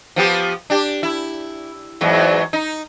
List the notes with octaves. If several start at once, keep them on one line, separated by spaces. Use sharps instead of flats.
F3 B3 G4
D4 G4
E4
E2 G#2 F#3
D#4